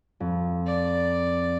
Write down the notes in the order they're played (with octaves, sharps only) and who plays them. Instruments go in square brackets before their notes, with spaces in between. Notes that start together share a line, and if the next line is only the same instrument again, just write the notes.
[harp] F2
[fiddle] D5